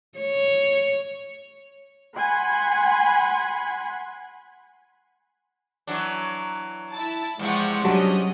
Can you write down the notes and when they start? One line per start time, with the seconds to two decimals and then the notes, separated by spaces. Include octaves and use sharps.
0.19 C#5
2.18 F#5 G#5 B5 C6
5.87 E3 F#3 D4
6.91 E4 A5
7.39 E2 C3 F3 G#3 F#5 C#6
7.85 F#3 G3 C#4 D4 D#5